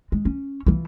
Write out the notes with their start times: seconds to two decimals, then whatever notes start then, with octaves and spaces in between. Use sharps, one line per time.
0.12 G#3
0.25 C#4
0.66 E3 F3